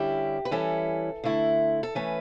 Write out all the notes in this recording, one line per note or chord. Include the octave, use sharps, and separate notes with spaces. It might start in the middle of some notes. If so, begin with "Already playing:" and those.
Already playing: D3 G3 C#4 E4 G4
B4
E3 G3 C#4 E4 A4
D3 A3 E4
A4
E3 A3 C#4 B4